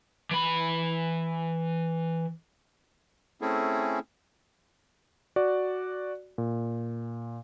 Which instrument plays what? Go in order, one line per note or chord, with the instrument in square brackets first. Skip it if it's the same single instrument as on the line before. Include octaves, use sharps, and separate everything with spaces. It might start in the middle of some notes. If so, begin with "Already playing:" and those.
[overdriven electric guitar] E3 B5
[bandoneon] A3 C4 C#4 E4 G#4 A4
[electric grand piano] F#4 D5
A#2